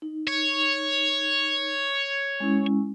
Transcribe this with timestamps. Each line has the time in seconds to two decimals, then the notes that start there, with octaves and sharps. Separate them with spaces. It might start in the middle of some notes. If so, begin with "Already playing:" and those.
0.02 D#4
0.27 C#5
2.40 G#3 C#4 E4